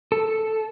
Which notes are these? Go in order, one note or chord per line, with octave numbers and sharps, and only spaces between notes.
A4